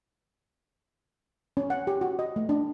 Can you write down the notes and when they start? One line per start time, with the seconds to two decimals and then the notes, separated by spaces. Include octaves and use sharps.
1.57 C#4
1.70 F#5
1.87 G4
2.01 F#4
2.19 D#5
2.36 A3
2.49 D4